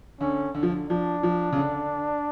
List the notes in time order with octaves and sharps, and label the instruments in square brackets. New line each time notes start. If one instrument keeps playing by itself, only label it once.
[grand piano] D3 [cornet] C#4
[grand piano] D3
F3
D3
[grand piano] F3 [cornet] D4
[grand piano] F3
C#3
D3